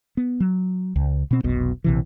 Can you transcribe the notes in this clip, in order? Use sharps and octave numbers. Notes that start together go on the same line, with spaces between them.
B3
F#3
C#2
B2 C4
F1 B1 B2
A#1 C3 E3